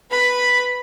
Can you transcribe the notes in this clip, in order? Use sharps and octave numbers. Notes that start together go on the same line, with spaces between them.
B4 B5